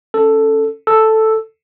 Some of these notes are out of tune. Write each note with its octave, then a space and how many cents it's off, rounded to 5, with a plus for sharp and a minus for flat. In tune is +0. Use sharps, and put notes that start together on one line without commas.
C#4 +0 A4 +5
A4 +0 E6 +0